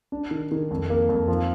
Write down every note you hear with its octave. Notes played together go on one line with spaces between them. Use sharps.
D4
D#3
D#3
F2
A#3
F2
F3